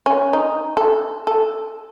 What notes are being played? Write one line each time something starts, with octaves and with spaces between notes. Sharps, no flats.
C#4
D#4
A4
A4